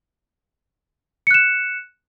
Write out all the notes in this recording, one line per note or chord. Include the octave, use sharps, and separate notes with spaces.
F#6 C#7 E7